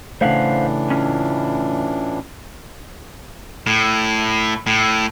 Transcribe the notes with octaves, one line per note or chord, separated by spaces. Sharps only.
A2 C#3 E3 A3 D4 C5 F5 F#5
C#4 F4
A2
A2